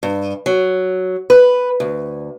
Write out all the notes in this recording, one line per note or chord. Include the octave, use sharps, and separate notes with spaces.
G2
F#3
B4
D2